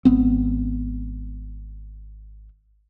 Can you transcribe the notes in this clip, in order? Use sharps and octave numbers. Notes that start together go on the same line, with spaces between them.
G#1 B3 C4